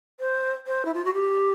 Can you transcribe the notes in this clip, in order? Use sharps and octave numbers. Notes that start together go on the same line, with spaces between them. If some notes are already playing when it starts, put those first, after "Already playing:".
C5
C5
E4
F4
F#4
G4